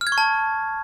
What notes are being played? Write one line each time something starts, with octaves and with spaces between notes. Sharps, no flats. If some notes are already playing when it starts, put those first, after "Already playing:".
F6
G#6
C#6
A5